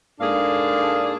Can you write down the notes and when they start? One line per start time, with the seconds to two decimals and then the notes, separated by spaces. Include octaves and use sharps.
0.21 G#2 A#3 D4 G#4 A4 F5